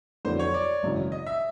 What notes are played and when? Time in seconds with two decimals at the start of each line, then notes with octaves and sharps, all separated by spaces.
0.25 F2 D3 F#3 B3 E4 C5
0.39 C#5
0.54 D5
0.83 G#1 F#2 C#3 E3
1.12 D#5
1.26 E5